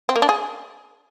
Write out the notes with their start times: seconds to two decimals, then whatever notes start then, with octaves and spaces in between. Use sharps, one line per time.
0.09 C4
0.16 A#3
0.22 D4
0.29 G#4